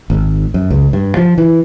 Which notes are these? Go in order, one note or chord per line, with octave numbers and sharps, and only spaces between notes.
G#1
F#2
C#2
G2
F3
E3